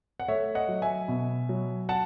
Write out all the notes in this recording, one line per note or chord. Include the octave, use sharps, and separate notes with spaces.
F#5
A3 C#5 E5
D#5 F#5
F#3
E5 G#5
B2
F#3
F#5 A5